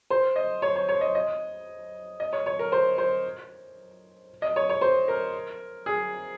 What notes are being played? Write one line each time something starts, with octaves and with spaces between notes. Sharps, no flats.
C5
D#5
C#5
C#5
C#5
D#5
D#5
D#5
C#5
C#5
A#4
C5
C5
D#5
C#5
C#5
C5
A#4
G#4